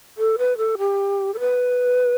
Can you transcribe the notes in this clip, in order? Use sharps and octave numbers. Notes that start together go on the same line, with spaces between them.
A4
B4
A4
G4
A4
B4